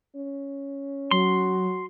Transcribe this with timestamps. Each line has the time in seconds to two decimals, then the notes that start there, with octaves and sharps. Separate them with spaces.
0.16 C#4
1.11 F#3 F#4 C6